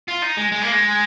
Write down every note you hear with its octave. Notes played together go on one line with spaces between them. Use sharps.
F4
D#4
G#3
G#3
A#3
G#3